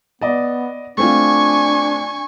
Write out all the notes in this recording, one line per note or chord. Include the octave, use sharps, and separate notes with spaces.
B3 D5 D#5
A3 C4 D4 F4 G#5 C#6